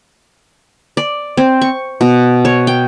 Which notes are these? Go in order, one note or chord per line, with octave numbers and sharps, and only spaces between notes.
D5
C4
C#6
B2
C#5
G5